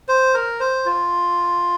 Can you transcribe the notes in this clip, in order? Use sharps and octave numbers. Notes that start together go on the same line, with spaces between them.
C5
A#4
C5
F4